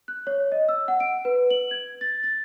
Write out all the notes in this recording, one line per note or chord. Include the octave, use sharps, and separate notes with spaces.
F#6
C#5
D#5
E6
F#5
D7
B4
F#7
G#6
A6
A6